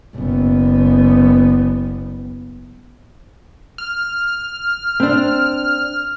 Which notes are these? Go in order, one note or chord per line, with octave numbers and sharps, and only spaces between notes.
F#1 B3
F6
C4 D4